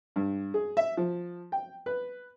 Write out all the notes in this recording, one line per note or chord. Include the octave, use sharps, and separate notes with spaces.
G2
G#4
E5
F3
G5
B4